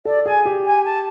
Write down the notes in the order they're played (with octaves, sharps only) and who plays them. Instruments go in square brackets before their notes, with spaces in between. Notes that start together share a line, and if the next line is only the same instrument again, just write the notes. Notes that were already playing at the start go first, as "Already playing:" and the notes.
[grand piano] A4 [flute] D5
[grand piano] G#4 [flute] G#5
[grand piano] G4
[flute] G#5
A5